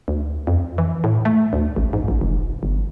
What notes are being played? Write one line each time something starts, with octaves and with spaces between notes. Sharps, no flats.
D2
F2
E3
A2
A3
D2
A1
G#2
A1
F1
G1